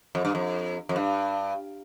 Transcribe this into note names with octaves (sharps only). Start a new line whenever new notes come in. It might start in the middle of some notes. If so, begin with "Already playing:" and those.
F2
G2
F2
F2
G2